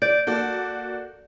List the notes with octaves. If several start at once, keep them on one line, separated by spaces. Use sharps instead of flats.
D5 G6 D7
A#3 F#4 A4 D5